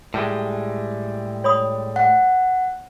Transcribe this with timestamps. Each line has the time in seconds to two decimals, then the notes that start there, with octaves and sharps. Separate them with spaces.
0.14 A2 G3 G#3
1.44 C#5 B5 D#6
1.96 F#5